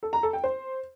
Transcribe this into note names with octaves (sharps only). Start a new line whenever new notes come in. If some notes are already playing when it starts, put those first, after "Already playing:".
A4
A#5
A4
G5
C5